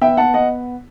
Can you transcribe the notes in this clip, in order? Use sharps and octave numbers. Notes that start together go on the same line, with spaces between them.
B3 E5 G5
F#5 A5
D#5 F#5